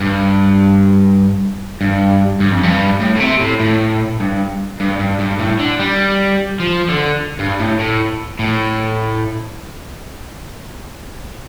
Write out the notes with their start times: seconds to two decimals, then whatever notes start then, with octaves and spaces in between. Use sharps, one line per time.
0.01 G2
1.81 G2
2.40 G2
2.52 F2
2.63 G2
3.01 A2
3.16 A2
3.20 C3
3.40 A2
3.60 A2
4.20 G2
4.80 G2
5.00 G2
5.20 G2
5.40 A2
5.59 D3
5.79 G3
6.60 F3
6.89 D3
7.39 G2
7.59 A2
7.79 A2
8.39 A2